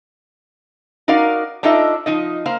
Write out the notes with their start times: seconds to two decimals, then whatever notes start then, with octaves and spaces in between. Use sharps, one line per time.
1.08 D#4 F#4 A#4 D5 F5
1.63 D4 D#4 F4 A4 D#5 E5
2.06 F3 D#4 D#5
2.46 A#3 C5 F5